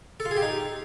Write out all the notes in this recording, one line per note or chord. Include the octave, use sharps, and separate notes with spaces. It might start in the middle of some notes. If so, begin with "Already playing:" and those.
A4
F4
G#4
G4
D#4